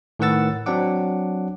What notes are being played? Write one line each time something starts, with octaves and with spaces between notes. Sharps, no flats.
A2 D#3 B4 F#5 E6 A6
F#3 C4 D4 F#5 D6